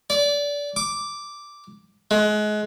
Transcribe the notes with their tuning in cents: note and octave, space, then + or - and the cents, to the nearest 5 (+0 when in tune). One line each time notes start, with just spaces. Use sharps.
D5 -25
D6 -5
G#3 +30